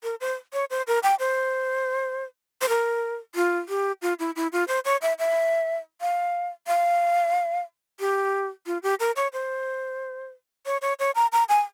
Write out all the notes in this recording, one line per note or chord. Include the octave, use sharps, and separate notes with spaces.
A#4
C5
C#5
C5
A#4
G5
C5
C5
A#4
F4
G4
F4
E4
E4
F4
C5
C#5
E5
E5
F5
F5
G4
F4
G4
A#4
C#5
C5
C#5
C#5
C#5
A#5
A#5
G#5